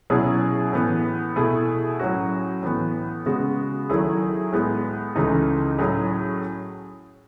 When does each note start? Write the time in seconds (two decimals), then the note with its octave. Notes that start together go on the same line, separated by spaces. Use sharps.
0.10 B2 F#3 C#4 E4 G#4
0.73 A2 E3 B3
1.36 B2 A3 E4 G#4
2.00 A2 F#3 C#4 F#4
2.63 A2 E3 B3
3.26 C#3 G#3 B3 F#4
3.90 D#3 F#3 A3 E4 G#4
4.52 A2 G#3 B3
5.15 C#2 C#3 E3 A3 D#4
5.78 A2 F#3 C#4 G#4